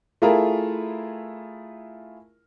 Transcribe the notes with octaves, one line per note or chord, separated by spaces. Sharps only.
A3 E4 F4 G#4 A#4